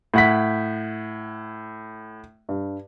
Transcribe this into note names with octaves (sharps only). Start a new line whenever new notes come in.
A2 F#5 B6
G2